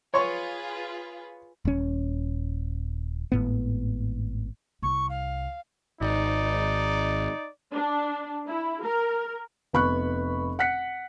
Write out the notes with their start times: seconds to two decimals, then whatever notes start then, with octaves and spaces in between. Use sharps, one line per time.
0.14 F4 G#4 B4 C#5 C6 C#6
1.65 D#1 C#4
3.32 G#1 A2 B3
4.83 C2 C#6
5.09 F5
6.01 G#1 D#4 D5
7.73 D4
8.48 E4
8.84 A#4
9.73 F1 B3 B5 C#6 F#6
10.59 F#5 F#6 B6 C#7